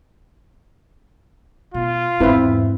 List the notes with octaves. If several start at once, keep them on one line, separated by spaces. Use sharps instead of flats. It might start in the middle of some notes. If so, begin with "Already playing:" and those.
B2 F4
E2 G#2 C4 E4 B4